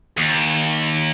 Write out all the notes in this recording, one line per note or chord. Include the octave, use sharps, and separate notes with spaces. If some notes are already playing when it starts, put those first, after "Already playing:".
D#2